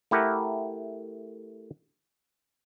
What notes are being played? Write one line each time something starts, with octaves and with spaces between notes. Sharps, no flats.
A3 E4 G4 A#4 F#5